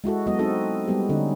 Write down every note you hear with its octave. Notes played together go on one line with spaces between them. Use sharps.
G#3 E4 F#4 A4
F#3 G#3 B3 F#4 D#5
C4 D#4 F#4 A4
G3 G#3 B3 G4
D3 C#4 D#4